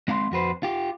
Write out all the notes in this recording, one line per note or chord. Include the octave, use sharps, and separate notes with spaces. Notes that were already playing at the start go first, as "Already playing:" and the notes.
G#3 C4 F5 F#5 C6
F2 F#4 B4 C5
F4 G4